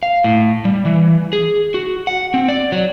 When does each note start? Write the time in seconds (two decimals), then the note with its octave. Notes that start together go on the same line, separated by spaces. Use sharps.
0.03 F5
0.24 A2
0.65 G3
0.85 E3
1.33 G#4
1.74 F#4
2.07 F#5
2.34 C4
2.48 D5
2.72 F#3